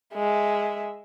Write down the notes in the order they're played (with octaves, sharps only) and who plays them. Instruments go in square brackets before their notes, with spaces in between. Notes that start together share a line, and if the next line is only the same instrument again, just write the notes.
[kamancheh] G#3 E5